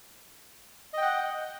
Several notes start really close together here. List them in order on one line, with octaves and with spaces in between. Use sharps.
D#5 G5 F#5